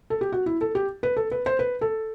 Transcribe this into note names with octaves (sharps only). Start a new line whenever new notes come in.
A4
G4
F#4
E4
A4
G4
B4
A4
B4
C5
B4
A4